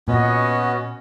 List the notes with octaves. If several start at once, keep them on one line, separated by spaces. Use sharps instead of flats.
A#2 B3 C#4 F#4 D#5